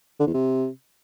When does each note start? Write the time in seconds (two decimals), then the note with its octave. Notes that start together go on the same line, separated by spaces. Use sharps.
0.20 D3
0.27 E2
0.34 C3